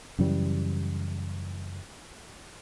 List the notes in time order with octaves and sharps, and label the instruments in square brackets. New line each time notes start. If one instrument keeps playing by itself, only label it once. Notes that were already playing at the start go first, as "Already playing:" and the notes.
[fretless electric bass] F#2 C#3 E3 G3